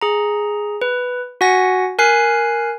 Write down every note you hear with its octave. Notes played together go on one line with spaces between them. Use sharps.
G#4 A#5
B4
F#4 F#5 G#5 A#6
A#4 G#5 F#6 C7